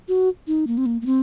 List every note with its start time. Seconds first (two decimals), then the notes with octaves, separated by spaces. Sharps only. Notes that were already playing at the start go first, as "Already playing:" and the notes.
0.08 F#4
0.47 D#4
0.67 A#3
0.78 C4
0.86 A#3
1.02 A#3
1.06 C4